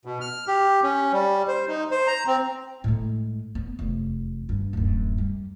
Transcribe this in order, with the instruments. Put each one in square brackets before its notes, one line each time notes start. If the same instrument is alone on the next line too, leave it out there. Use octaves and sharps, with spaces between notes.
[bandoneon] B2
F6
G4
C#4
G3
C5
D#4
C5
A#5
C4
[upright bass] A2 G#3
B3
F1 E2
G2
D1 F#2
G3